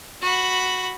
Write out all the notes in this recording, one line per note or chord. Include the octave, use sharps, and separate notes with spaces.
F#4 B5